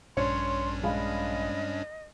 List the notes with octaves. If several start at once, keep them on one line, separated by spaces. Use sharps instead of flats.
A#1 G2 C#4 D4 C#5 C6
G#3 D#5 F5 B5